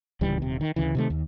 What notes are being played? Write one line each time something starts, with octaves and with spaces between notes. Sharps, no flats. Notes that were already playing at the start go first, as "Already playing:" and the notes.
D1 C#2 E3 G3
D#1 C3
D#3
D2 C#3 E3
C3 D#3 A3
D#2